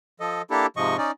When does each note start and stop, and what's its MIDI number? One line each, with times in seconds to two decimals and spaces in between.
0.20 0.42 53
0.20 0.42 69
0.20 0.42 75
0.51 0.66 58
0.51 0.66 62
0.51 0.66 64
0.51 0.66 67
0.51 0.66 69
0.77 0.97 44
0.77 0.97 48
0.77 0.97 53
0.77 0.97 75
0.77 0.97 85
0.98 1.11 61
0.98 1.11 63
0.98 1.11 74